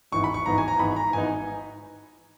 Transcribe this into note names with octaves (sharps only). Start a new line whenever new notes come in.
G#1 G#2 E3 B3 D#4 C#6
B5
C#6
G#1 G#2 E3 B3 D#4 A#5
G#5
A#5
G#1 G#2 E3 B3 D#4 B5
A#5
G#1 G#2 E3 B3 D#4 G#5